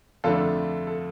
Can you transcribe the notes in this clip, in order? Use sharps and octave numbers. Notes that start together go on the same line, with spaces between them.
F2 D3 A3 D4 F4 A4
A4